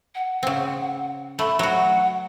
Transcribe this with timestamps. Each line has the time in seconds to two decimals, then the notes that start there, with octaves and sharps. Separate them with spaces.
0.15 F#5
0.43 C#3 C4
1.39 A3 B5
1.59 F#3 F#4 F#5